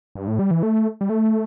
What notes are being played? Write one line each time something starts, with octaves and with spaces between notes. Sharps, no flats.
G2
A2
G3
E3
A3
G3
A3